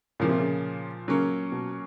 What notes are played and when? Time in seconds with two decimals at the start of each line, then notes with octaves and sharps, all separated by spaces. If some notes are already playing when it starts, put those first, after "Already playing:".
0.20 A#2 C#3 F3 A#3
0.29 C3
0.38 C#3
1.08 C#3 F#3 A#3 C#4
1.52 B2